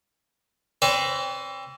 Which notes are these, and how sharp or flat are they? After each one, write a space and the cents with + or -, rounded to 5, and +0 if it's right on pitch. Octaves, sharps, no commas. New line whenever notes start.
C4 +30 B4 +35 D5 -45